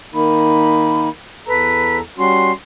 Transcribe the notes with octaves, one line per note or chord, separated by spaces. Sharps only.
D#3 A#3 D#4 B5
E2 A4 B4 A#5
G3 C#4 F#4 C6